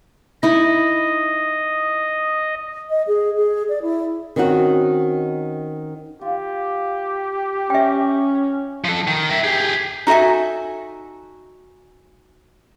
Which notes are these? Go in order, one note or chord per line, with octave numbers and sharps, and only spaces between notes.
D#4 E4 D#5
D#5
G#4
G#4
D5
E4
D#3 C4 C#4 D#4 F#4
F4 G4
C#4 E5 G5
F3 A4
D#3
A#4 E5
G4 G#4
D#4 F#4 A4 E5 G#5